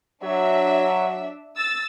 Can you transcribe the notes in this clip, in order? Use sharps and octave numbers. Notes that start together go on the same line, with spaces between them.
F#3 D4 E5
E6 A6